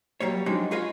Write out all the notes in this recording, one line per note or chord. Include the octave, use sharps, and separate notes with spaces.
F#3 G3 A#3 C#5
F3 F#3 G#3 C4 D4 D#4
F4 G#4 B4 C#5 D#5 F5